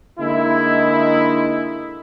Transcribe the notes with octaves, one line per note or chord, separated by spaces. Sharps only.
D3 G#3 A#3 D#4 E4